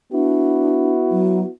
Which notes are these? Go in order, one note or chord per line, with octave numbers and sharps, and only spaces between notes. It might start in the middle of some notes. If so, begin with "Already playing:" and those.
B3 D4 E4 F#4
F#3